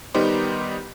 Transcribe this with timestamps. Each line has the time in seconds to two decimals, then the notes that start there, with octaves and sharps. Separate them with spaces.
0.14 D#3 G3 B3 D#4 G4 C5